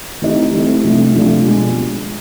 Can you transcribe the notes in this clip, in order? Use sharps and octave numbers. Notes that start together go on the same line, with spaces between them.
E3 A3 C4 D#4 G4
E3 A3 C4 D#4 G4
C3 F3 A3 D4 G4
C3 F3 A3 D4 G4
B2 G#3